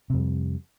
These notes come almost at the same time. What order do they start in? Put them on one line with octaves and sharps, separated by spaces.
C3 F2 G3